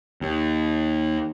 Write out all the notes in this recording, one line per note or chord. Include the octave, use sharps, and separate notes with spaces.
D#2